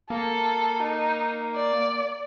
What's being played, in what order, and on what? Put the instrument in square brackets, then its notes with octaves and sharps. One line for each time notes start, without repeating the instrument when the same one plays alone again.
[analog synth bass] A#3 [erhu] A4
[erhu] D#4
D5